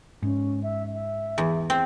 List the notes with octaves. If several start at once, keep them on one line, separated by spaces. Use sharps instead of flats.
G#2 C#4
E5
E5
E2
C4